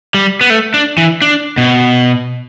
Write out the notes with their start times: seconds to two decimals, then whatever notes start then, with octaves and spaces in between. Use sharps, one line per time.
0.14 G3
0.41 B3
0.50 A3
0.74 D4
0.98 E3
1.22 D4
1.58 B2